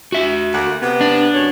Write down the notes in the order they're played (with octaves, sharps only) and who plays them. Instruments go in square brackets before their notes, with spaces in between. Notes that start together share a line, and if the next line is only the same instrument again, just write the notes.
[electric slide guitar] F#4 E5
[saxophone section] D2 A#3 F#5
C3 B3
[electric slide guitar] D4
[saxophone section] F#2 C#5